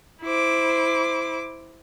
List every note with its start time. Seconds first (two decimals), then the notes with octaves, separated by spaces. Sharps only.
0.23 E4 C5 D6